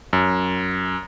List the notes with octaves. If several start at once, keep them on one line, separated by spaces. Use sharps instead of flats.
F#2